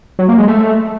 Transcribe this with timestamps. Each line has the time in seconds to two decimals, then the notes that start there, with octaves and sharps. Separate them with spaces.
0.19 F#3
0.29 A#3
0.38 G#3
0.48 A3